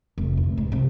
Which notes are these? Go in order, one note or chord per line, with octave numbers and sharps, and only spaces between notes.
F1
D2
G#2
C3